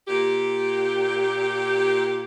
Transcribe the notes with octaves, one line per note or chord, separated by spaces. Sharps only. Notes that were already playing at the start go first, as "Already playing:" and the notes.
A#2 G4